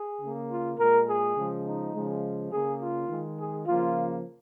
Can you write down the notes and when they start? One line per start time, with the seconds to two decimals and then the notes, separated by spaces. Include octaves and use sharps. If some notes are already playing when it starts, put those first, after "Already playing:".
Already playing: G#4
0.22 C#3 A#3
0.50 F4
0.79 A#2 G#3 A#4
1.08 G#4
1.37 C#3 F3 G#3
1.66 D#4
1.95 C#3 F3 G#3
2.52 C#3 A#3 G#4
2.80 F4
3.09 D#3 G#3
3.38 G#4
3.66 C#3 F3 A#3 F4